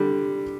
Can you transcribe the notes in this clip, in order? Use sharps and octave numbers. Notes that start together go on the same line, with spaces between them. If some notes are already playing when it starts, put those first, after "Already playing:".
Already playing: D3 G3